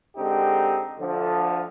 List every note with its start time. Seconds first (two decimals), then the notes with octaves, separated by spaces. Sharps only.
0.16 D3 G#3 C4 D#4 G4
0.99 D2 D3 F3